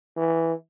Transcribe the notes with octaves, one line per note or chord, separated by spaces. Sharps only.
E3